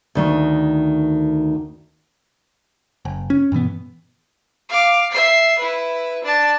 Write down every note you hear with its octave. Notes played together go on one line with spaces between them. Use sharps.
D2 D#3 A3
F#1
C#4
G2 B2 E3 B3
F5 D6
E5 C7
E4 B4
D4 A5